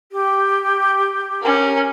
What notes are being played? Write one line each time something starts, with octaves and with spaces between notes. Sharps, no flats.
G4
C#4 A#4